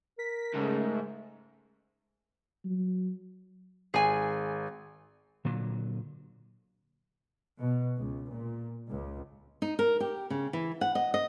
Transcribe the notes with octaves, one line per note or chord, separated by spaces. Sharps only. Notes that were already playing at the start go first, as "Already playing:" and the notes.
A#4 B6
G#2 C#3 A3
F#3
G#1 G#4 G#5
A#2 D3 F#3
B2
C#2
A#2
C#2
D#4
A#4
G4
C#3
E3
F#5
D#5
D#5